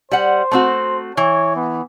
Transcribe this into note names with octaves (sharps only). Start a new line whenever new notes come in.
G3 C5 F#5
A3 C4 F#4
E3 C#5
B3